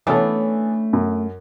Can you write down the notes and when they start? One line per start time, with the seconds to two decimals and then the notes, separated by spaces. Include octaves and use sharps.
0.07 E3 A3 B3 C#4 D4 A4
0.93 F#2